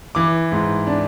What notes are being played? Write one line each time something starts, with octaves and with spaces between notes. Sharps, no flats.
E3 D6
G#2
D4